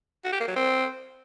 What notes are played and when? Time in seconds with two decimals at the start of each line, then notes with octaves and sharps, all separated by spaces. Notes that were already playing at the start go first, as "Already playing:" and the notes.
0.24 F#4
0.32 G4
0.40 A#3
0.48 F#3
0.56 C4